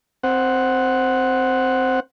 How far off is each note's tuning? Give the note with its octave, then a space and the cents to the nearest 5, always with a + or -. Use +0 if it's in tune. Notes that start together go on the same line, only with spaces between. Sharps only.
C4 +0 C5 +0 F#5 +0